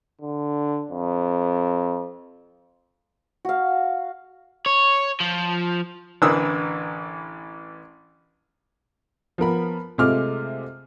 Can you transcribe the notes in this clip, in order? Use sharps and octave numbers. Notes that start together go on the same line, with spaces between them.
D3
F2
F#4 F5
C#5
F3
A1 D3 E3 A#4 D#6 E6
F3 B3 A#4 B5
C3 G#3 A3 F4 D6 F6